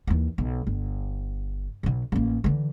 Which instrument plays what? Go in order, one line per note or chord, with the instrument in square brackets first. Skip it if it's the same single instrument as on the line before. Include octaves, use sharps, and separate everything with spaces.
[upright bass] D#2 E3
B1
G1
B1 B2
A1 A#3
D3 E3